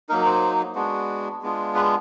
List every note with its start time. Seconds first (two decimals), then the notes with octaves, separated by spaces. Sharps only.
0.09 F#3 A#3 D#4 A#4
0.26 C5
0.75 G#3 B3 D4 F#4
1.42 G#3 B3 D4 F4
1.75 B4